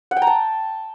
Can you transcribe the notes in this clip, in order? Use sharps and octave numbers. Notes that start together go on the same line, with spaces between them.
F#5
G5
A#5
A5